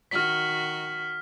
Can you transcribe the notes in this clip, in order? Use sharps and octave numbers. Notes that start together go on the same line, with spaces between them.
D#3 F#4 F6 B6